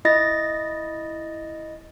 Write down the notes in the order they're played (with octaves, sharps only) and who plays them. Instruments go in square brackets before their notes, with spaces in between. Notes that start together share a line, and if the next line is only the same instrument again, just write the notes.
[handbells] E4 D#5 A6 A#6